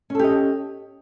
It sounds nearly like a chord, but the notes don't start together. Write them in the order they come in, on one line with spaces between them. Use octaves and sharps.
C#4 A4 G4 D#5